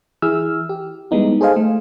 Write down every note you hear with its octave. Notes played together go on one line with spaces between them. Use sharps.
E3 E4 G#4 E6 F6
G4
G3 G#3 B3 D#4 E4
G#4 A4 C5 D#5 F5 G#5
A3